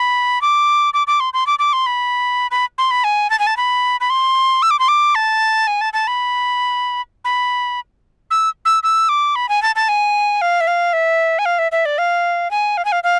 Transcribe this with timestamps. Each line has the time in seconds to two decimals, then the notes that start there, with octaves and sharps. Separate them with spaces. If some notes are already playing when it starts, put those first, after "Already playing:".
Already playing: B5
0.42 D6
0.94 D6
1.07 D6
1.20 C6
1.34 C6
1.47 D6
1.59 D6
1.73 C6
1.86 B5
2.51 B5
2.78 C6
2.91 B5
3.04 G#5
3.30 A5
3.39 G#5
3.47 A5
3.57 B5
4.01 B5
4.10 C6
4.62 E6
4.71 D6
4.79 C6
4.88 D6
5.15 A5
5.67 G#5
5.81 A5
5.93 A5
6.07 B5
7.25 B5
8.31 E6
8.65 E6
8.83 E6
9.09 D6
9.36 B5
9.49 G#5
9.62 A5
9.76 A5
9.89 G#5
10.41 F5
10.61 E5
10.67 F5
10.93 E5
11.39 G#5
11.46 F5
11.59 E5
11.72 E5
11.85 D5
11.98 F5
12.51 G#5
12.77 F5
12.85 G#5
12.92 F5
13.04 F5